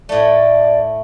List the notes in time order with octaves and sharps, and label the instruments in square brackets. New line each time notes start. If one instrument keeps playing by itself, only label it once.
[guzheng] A2 A3 [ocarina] D5